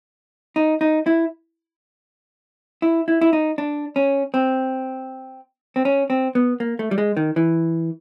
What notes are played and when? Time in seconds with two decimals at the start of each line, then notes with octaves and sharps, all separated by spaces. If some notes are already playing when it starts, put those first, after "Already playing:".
0.56 D#4
0.81 D#4
1.06 E4
2.82 E4
3.08 E4
3.21 E4
3.33 D#4
3.58 D4
3.96 C#4
4.34 C4
5.76 C4
5.85 C#4
6.10 C4
6.35 B3
6.60 A#3
6.79 A3
6.91 G3
6.98 G#3
7.17 D#3
7.36 E3